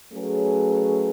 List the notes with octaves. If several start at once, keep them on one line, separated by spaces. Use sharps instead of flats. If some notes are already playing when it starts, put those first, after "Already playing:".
F#3 A3 C#4 G#4 B4